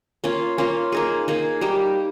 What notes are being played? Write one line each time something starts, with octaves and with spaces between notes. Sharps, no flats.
A#3 C#4 F4
A#3 C#4 F4
A#3 D#4 G#4
A#3 D#4 G#4
G3 A#3 D#4 G4